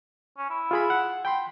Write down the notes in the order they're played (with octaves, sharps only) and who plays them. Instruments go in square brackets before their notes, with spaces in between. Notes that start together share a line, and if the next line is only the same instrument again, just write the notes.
[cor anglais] C#4
E4
[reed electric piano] F4 G#4 B5
F#5
G5 B5 C6